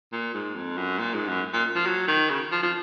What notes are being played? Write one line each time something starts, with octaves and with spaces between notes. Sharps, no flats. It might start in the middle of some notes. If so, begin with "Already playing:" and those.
A#2
G#2
F2
F#2
A#2
G#2
F#2
A#2
F3
F#3
D#3
C#3
F3
F3